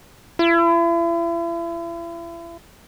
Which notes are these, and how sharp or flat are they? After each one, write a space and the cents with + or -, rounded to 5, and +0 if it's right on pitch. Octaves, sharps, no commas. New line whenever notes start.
E4 +40